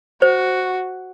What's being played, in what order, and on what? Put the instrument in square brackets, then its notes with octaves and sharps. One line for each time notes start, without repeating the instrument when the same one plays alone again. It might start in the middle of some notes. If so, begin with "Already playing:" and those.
[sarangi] F#4 [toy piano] C5